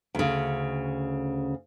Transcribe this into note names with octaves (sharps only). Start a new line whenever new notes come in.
D2 C#3